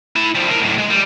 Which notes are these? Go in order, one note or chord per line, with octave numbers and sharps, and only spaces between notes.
E4 A5
F3 G3
A2 A#4
D#2 A2
G#3
G3